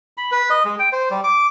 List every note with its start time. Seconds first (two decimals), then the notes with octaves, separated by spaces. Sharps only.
0.17 B5
0.32 B4
0.50 D#5
0.65 G#3
0.79 G5
0.93 C5
1.11 G3
1.24 D6